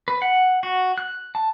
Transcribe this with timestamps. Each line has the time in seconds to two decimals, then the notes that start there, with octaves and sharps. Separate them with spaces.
0.08 B4
0.22 F#5
0.63 F#4
0.98 F#6
1.35 A5